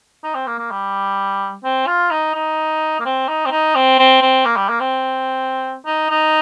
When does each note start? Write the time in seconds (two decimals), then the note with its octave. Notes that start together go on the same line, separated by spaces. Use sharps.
0.24 D#4
0.35 C4
0.47 A#3
0.59 A#3
0.71 G3
1.64 C4
1.87 F4
2.11 D#4
2.34 D#4
3.00 A#3
3.05 C4
3.28 D#4
3.46 C4
3.51 D#4
3.76 C4
3.99 C4
4.22 C4
4.45 A#3
4.57 G3
4.69 A#3
4.80 C4
5.86 D#4
6.10 D#4